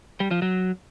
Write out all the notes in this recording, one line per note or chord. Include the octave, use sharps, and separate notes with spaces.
G3
F3
F#3